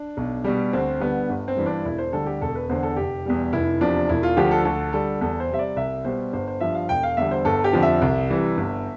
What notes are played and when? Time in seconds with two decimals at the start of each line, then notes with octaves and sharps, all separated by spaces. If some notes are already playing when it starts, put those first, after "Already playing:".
Already playing: D4
0.17 B1
0.44 B2 G3
0.73 D2 C4
1.00 D3 G3 B3
1.29 G1
1.48 C4
1.56 G2 E3 G3
1.66 D4
1.85 E1 E4
1.98 C5
2.13 D2 D3 G3 A4
2.26 G4
2.41 E1 A4
2.55 B4
2.69 E2 D3 C5
2.83 A4
2.97 F1 G4
3.26 E2 B2 G3
3.53 F1 E4
3.81 E2 C3 F3 D4
4.09 E1 E4
4.23 F4
4.37 D2 D3 F3 G4
4.51 A4
4.65 D2 A4
4.93 D3 G3 A4
5.21 E2 A4
5.40 C5
5.49 C3 G3 E5
5.59 D5
5.76 C2 E5
6.05 B2 G3 C5
6.33 G1 C5
6.48 C5
6.61 G2 F3 E5
6.75 F5
6.89 E1 G5
7.03 F5
7.17 E2 D3 G3 E5
7.31 C5
7.45 G1 A4
7.64 G4
7.73 F2 D3 F3
7.82 E5
8.02 C2
8.29 C3 E3 G3
8.57 G1